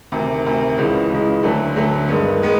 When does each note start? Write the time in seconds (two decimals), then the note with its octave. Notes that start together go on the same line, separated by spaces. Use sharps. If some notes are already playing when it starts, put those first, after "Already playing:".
0.12 D2 C3 D#3
0.45 D2 C3 D#3
0.78 C#2 C#3 E3 G#3
1.10 C#2 C#3 E3 G#3
1.43 D2 D3 F#3 A3
1.76 D2 D3 F#3 A3
2.08 G2 D#3 G#3 B3
2.42 D#3 G#3 B3